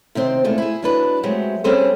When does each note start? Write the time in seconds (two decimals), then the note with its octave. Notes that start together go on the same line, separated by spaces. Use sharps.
0.15 C3 D#3 C4 C5
0.44 A#2 G#3 A3 E4
0.58 E4 G#4
0.82 F#3 D4 B4
1.23 F#3 G#3 A3 C4 G4
1.64 G3 C4 C#4 G#4 A4 C5